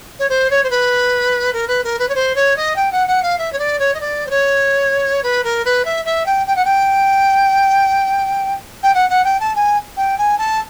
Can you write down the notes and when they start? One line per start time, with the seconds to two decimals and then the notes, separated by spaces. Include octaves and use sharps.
0.19 C#5
0.29 C5
0.50 C#5
0.63 C5
0.70 B4
1.53 A#4
1.68 B4
1.84 A#4
1.99 B4
2.09 C#5
2.15 C5
2.35 C#5
2.56 D#5
2.76 G5
2.92 F#5
3.08 F#5
3.22 F5
3.38 E5
3.52 C#5
3.59 D5
3.79 C#5
3.94 D#5
4.00 D5
4.26 C5
4.30 C#5
5.23 B4
5.44 A#4
5.65 B4
5.85 E5
6.05 E5
6.26 G5
6.47 G5
6.56 F#5
6.65 G5
8.83 G5
8.94 F#5
9.10 F#5
9.24 G5
9.40 A5
9.55 G#5
9.97 G5
10.18 G#5
10.38 A5